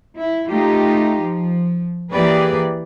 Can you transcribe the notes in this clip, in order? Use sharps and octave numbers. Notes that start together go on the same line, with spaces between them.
E4
A3 D#4 F4 G4
F3
E3 A#3 G4 G#4 B4 D5